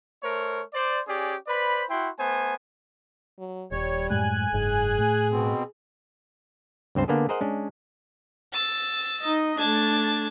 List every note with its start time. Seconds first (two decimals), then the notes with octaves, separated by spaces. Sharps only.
0.23 A3 A#4 C5 C#5
0.74 C5 D5
1.08 C#4 G4 G#4 D5
1.47 B4 C5 D5 B5
1.90 E4 F#4 G5 C6
2.18 A3 B3 C5 G#5
3.39 F#3
3.72 D#1 G3 C#5
4.10 F#2 A2 G#3 G#5 F#6
4.52 F#1 G#2 G#4
4.98 A2 A3
5.31 B2 C4
6.95 C#2 G2 C4 C5 A5
7.08 D3 A#3 B3 D4 G#4
7.29 G#4 A#4 C5 D#5 F#5
7.41 G#3 C#4 D4
8.53 E6 A6
9.22 D#4 D#5
9.59 A3 D4 A5 G#6